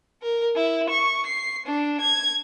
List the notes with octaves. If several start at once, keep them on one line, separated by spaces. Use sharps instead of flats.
A#4
E4
C#6
C7
D4
G#6